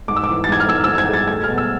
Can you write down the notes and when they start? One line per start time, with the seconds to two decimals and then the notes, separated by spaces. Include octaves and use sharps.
0.08 G#2 D6
0.16 E6
0.24 D6
0.29 E3
0.44 A6
0.49 G#2 G#6
0.60 F6
0.68 G#2 E6
0.84 E6
0.88 G#2
0.98 G#6
1.09 G#3 A6
1.28 A3 G#6
1.43 F6
1.48 B2
1.58 E6